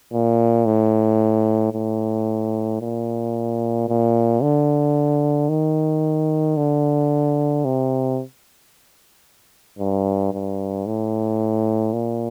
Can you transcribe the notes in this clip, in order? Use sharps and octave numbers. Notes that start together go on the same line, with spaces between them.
A#2
A2
A2
A#2
A#2
D3
D#3
D3
C3
G2
G2
A2
A#2